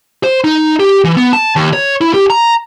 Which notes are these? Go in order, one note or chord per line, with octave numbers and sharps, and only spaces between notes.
C5
D#4
G4
E3
B3
A5
D#2
C#5
E4
G4
A#5